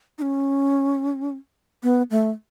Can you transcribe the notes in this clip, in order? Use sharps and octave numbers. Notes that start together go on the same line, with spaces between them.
D#4
C#4
B3
A3